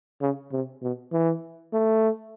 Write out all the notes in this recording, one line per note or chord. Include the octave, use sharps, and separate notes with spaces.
C#3
C3
B2
E3
A3